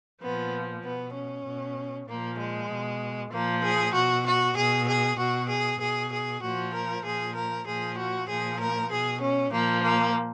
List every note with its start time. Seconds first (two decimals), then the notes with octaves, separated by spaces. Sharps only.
0.22 A#2 F3 B3
0.84 B2 B3
1.14 C#4
1.45 B2
2.08 A#2 F3 A#3
2.38 G#3
2.69 B2
3.31 A#2 F3 A#3
3.63 G#4
3.94 B2 F#4
4.24 F#4
4.56 B2 G#4
4.87 G#4
5.18 B2 F#4
5.49 G#4
5.80 B2 G#4
6.11 G#4
6.42 A#2 F3 F#4
6.73 A#4
7.03 A#2 F3 G#4
7.35 A#4
7.66 A#2 F3 G#4
7.97 F#4
8.28 A#2 F3 G#4
8.59 A#4
8.90 B2 G#4
9.20 C#4
9.52 A#2 F3 A#3
9.83 A#3